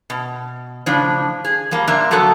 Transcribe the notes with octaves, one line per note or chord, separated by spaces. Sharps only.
B2
A2 C#3 F3 D4
G#4
F3 G3 A#3
A#2 D3 A#3 D4 E5
F#3 A3 B3 F#4 A4